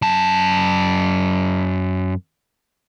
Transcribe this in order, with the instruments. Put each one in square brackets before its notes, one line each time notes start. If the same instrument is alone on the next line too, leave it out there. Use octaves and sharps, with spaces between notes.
[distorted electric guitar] F#2 A5